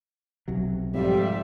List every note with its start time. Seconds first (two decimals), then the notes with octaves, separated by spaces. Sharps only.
0.48 B1 C3 F#3
0.94 F2 G#2 G3 F4 E5